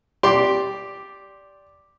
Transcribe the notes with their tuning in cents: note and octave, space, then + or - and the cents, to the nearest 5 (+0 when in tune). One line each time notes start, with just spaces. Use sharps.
G4 +0 D5 -10 C6 +0